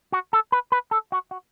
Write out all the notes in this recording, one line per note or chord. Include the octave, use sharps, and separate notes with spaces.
F#4
A4
B4
B4
A4
F#4
F#4